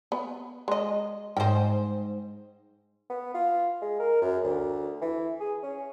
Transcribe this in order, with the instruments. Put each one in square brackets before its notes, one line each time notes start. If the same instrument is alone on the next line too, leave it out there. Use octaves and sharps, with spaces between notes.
[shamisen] B3
G#3 D#5
[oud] G#2 C5 [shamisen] D#5 G5
[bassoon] B3
F4
G#3
A#4
F#2
D2
E3
G#4
C#4